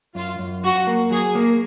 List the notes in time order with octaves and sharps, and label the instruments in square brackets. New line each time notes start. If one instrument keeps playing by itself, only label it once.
[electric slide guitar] F#2 [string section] F4
[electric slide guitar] F#2
[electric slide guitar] F#3 [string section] F#4
[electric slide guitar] A#3
[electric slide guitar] F#3 [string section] G#4
[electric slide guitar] A#3